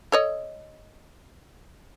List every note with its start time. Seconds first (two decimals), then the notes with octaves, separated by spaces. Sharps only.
0.12 A4 C#5 D#5